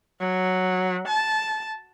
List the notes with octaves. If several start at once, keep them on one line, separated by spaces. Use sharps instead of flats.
F#3
A5